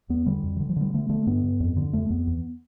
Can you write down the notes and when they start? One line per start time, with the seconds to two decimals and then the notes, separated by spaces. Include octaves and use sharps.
0.09 E2 B3
0.26 D3 G3
0.43 F2
0.56 E3
0.60 D3
0.69 F3
0.76 D3 G3
0.94 D3 A3
1.09 D3 A3
1.27 G2 B3
1.44 G2
1.60 F2
1.76 D3
1.93 F2 A3
2.10 F2 B3
2.27 E2